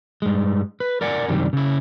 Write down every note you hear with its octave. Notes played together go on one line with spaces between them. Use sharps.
G2 G#3
B4
A#4 D5 F#5 G#5
C2 F#2 D#3 G3
C#3 E4